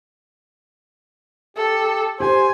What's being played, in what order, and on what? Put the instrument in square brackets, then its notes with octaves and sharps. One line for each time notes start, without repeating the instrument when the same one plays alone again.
[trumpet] G4 [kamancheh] A4
[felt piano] G4 [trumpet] C5 [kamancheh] G#5